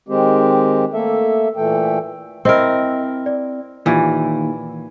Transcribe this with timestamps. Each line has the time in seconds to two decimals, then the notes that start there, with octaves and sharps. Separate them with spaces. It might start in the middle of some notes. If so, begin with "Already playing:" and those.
0.09 D#3 G#3 C4 G4
0.94 A3 A#3 A4 E5
1.56 A#2 E3 A3 A4 G5
2.45 C4 E4 A#4 C5 D#5
3.26 D5
3.86 D#2 A#2 E3